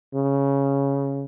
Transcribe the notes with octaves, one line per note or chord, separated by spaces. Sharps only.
C#3